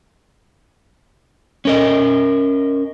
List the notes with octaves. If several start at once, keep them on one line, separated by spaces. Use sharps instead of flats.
C#4 A#4 D#5